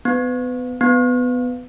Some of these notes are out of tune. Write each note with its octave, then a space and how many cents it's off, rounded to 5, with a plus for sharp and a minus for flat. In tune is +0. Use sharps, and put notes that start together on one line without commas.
B3 +25
B3 +15